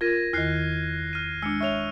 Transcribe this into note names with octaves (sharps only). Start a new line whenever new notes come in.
F4 A#4 G#6 A#6 D#7
E2 D#3 F6 F#6 C7
F6 D#7
G#3 D4 E6 C#7
C#5 E5 C#6 F6 F7